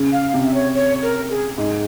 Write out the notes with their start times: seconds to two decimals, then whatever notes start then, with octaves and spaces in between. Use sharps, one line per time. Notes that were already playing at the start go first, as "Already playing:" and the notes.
Already playing: C#3
0.12 F5
0.34 C3
0.43 E5
0.54 C#5
0.75 C#5
1.02 A#4
1.30 G#4
1.58 G#2 G#4